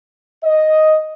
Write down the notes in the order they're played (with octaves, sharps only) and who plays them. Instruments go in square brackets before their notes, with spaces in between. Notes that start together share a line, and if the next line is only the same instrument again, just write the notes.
[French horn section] D#5